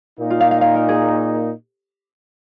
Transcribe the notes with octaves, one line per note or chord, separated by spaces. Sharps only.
A#2 A#3 D#4
F4
F5
F5
F5
A#4
G#4